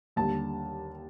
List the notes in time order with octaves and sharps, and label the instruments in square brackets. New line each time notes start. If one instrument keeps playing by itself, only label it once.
[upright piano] D#2 D3 G3 A5